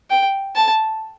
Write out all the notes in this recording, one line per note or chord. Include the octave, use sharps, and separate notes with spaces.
G5
A5